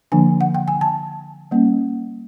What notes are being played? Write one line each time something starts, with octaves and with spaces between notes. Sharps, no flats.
D3 F3 A#3 D4 G#5
F#5
G5
G#5
A5
G3 A#3 C#4